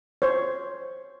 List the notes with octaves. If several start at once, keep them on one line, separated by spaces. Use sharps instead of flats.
C5 C#5